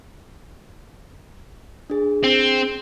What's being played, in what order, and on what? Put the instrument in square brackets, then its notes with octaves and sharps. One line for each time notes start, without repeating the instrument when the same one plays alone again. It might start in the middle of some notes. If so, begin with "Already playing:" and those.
[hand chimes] D4 G#4
[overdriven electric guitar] C4